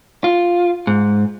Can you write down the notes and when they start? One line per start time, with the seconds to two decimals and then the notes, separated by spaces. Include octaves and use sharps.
0.24 F4
0.87 G#2